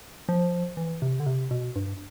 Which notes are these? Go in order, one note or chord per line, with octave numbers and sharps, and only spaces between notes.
F3
E3
C3
D3
C3
B2
G2